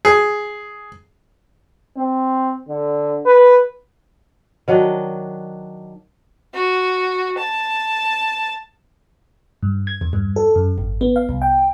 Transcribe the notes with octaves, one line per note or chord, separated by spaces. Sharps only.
G#4
C4
D3
B4
D#3 F#3 D4 D#5
F#4
A5
G2
G#6
E2
G2
A4
F#2
G#1
B3
F5
C2
G5